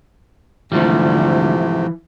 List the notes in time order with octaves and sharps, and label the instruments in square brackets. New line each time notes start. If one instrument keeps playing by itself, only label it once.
[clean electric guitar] D2 G3 [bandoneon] G#2 C3 A3 [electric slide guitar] E3 F3